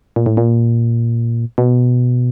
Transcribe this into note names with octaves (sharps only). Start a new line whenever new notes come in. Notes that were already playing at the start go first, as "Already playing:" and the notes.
A#2
A2
A#2
B2